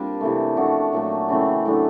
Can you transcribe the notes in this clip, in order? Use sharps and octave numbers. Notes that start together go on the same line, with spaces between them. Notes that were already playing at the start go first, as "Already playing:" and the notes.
Already playing: G3 A#3 C4 D4 F4
C3 E3 A3
F3 A3 D4 F#4
A#2 F#3 A3
C#3 E3 A3 C4
A2 F#3 A3 D4